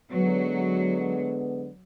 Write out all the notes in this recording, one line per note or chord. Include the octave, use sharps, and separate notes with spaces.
D3 F#3 G#3 B3